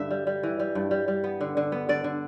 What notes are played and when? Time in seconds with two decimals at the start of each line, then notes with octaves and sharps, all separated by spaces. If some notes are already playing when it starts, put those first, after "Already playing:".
Already playing: G2 D3 E5
0.10 G3
0.27 G3
0.43 E3
0.59 G3
0.75 G2
0.91 G3
1.08 G3
1.24 B3
1.41 D3
1.57 D3
1.72 B3
1.89 D3 D5
2.04 D3